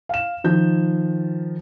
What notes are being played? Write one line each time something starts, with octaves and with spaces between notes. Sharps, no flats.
F5 E7
D#3 F3 G6